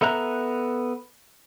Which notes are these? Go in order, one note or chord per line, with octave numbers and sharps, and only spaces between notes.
B3 A4 E5 A#5 F#6